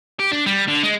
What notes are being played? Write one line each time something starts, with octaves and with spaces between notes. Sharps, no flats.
G4
D4
G3
D3
G#3